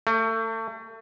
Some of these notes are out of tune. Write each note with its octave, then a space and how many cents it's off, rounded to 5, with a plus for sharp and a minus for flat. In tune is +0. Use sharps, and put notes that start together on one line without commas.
A3 +35